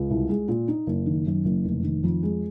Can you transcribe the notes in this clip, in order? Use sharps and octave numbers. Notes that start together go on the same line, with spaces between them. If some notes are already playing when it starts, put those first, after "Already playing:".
Already playing: C#2
C2
G#3
A#2
D#4
F#1
D#3
F#2
F#1
F1
D#3
F2
G#3